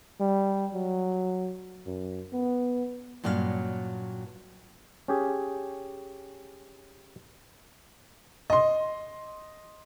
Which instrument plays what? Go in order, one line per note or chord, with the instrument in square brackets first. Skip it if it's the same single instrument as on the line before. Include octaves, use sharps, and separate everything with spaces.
[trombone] G3
F#3
F#2
B3
[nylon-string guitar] G2 A#2 F#3 C#4 G4 F5
[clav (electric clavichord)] C#4 G4 G#4
[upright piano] D#5 C6